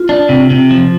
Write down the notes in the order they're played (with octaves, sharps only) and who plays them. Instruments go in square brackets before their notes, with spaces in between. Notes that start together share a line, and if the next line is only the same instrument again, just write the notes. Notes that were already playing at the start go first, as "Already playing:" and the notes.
Already playing: [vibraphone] F4
[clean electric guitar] D4
C3
C3
F3